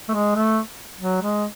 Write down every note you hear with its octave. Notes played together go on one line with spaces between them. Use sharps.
A3
G#3
A3
F#3
G#3